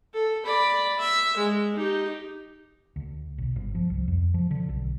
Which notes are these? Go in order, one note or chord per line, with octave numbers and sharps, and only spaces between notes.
A4
D5 B5
E5
G#3
D#4 G4
D2
B1
G1
F3
C2
F2
F3
D3
B1